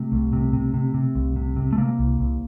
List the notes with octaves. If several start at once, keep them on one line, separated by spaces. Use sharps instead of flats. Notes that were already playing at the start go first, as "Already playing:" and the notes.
Already playing: C3 A3
C2
C3
C3
C3
C3
C2
C3
C3
A3
C3 A#3
C2
C2